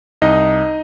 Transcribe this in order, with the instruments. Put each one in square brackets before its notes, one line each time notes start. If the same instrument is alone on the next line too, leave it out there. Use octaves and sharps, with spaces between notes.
[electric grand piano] C2 D#4 D#5